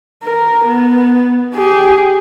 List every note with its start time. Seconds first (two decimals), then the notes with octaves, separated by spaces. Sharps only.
0.23 A#4
0.65 B3
1.55 G4 G#4